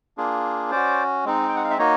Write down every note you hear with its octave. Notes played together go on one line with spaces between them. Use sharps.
A#3 D4 F4 G#4
C#4 F#4 C5 D5
G#3 C4 D#4
G5
F#5
F5
E5
A#3 D#4 F#4 C#5 D#5